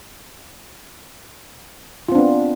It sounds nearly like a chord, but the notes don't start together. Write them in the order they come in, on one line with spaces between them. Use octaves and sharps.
F4 C4 D4 B3